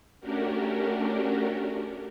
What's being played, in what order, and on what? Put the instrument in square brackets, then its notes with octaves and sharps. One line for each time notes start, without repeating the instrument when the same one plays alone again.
[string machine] A3 C#4 D4 F#4 G4 A#4